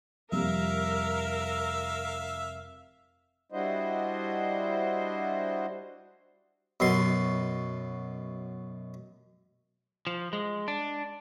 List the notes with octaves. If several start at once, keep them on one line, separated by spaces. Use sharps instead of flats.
F1 F2 G3 A#4 E5 F5 E6
G3 D4 E4 F#4 C5 D#5
F#2 B2 C6
F3
G#3
D4